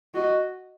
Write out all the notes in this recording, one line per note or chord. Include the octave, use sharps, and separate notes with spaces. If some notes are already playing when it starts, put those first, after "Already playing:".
F#4 D#5